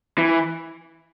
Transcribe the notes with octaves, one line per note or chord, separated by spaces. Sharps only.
E3